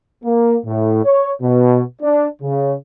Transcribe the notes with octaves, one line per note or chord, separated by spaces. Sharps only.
A#3
A2
C#5
B2
D4
C#3